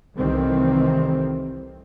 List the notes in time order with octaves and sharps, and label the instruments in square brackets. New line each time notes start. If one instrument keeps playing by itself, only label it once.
[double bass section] C2 D#3 E3 G3 A3 C4